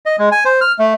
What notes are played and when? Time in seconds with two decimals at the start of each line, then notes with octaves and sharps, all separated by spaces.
0.06 D#5
0.18 G#3
0.32 G#5
0.45 C5
0.61 F6
0.79 A3